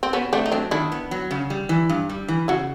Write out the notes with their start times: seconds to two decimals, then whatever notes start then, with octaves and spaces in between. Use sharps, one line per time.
0.03 C4
0.13 B2 B3 C#4
0.33 A3 C4 D4
0.46 D#4
0.52 F#3 C4 D4
0.71 D#3 D4 E4
0.92 B3
1.11 F#3
1.31 C#3
1.50 G3
1.69 E3
1.89 G2
2.09 G3
2.28 E3
2.48 C#3 E4 F#4